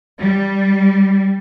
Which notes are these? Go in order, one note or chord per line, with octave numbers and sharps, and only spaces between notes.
G3